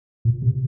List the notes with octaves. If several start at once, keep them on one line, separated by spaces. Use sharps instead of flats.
A#2
C3